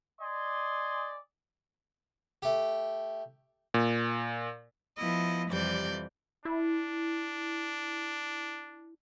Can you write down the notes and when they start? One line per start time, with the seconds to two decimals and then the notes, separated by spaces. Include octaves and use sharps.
0.21 D5 D#5 G#5 C6
2.42 A3 G4
3.74 A#2
4.98 F3 B3 E4 D#5
5.49 F2 C3 E3 G3 D5 G6
6.45 D4 E4